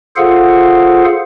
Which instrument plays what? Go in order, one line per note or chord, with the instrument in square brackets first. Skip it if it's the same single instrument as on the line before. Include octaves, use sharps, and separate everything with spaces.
[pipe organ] F4 G#4 A4 C5 F5 F#5